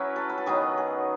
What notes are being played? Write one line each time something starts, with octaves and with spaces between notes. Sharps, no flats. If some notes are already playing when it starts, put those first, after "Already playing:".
Already playing: F#3 C#4 E4 B4
A4
B4
A4
D#3 F#3 B3 D#4 G#4
G#4